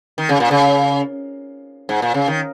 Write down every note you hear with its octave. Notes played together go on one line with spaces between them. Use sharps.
D#3
C#3
A#2
C#3
G#2
A#2
C#3
D#3